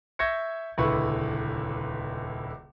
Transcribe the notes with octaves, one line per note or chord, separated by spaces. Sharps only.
E5 C#6 G6 G#6 A#6 C#7
D#1 C#2 D3 E4 B4 C#6